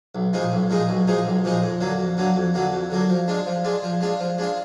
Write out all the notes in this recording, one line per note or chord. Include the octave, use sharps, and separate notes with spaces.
B1
A#2 F3 G#3 D#4
B1
A#2 F3 G#3 D#4
B1
A#2 F3 G#3 D#4
B1
A#2 F3 G#3 D#4
F2
D3 F#3 A#3
F2
D3 F#3 A#3
F2
D3 F#3 A#3
F2
D3 F#3 A#3
F3
G#3 D4 F4
F3
G#3 D4 F4
F3
G#3 D4 F4
F3
G#3 D4 F4